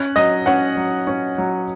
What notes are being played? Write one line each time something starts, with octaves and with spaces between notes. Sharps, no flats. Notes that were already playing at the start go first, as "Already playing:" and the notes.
Already playing: C#4 F#6
F#3 D#5
C#4 F#5
F#3
C#4
F#3